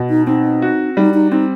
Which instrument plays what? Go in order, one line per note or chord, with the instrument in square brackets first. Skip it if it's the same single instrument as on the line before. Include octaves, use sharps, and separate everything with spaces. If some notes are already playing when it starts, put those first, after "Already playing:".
Already playing: [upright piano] B2
[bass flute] D#4
[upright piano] C4 [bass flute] D#4
[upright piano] F#4
[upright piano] G3 [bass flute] D#4
[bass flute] D#4
[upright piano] C4 [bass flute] D#4